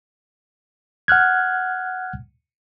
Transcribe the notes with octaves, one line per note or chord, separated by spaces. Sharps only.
F#5 F6 F#6 G#6